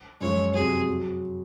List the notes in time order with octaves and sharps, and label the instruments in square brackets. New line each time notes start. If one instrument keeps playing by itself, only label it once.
[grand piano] F#2 F3 G#3 [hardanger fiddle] C#5
[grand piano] F2 C3 F#3 C4 [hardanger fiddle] G#4
[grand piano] F#3